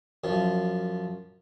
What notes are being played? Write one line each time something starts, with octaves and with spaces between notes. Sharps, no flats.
F#2 F3